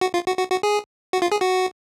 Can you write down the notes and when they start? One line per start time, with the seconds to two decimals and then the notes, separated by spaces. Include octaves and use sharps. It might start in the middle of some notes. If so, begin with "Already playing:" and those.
0.01 F#4
0.14 F4
0.27 F#4
0.38 F#4
0.51 F#4
0.63 G#4
1.13 F#4
1.22 F4
1.32 G#4
1.41 F#4